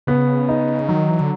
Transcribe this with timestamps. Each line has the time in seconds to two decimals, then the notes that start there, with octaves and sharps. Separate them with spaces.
0.07 C#3 B3
0.48 D#4
0.89 D#3 F#3
1.10 E3
1.21 D3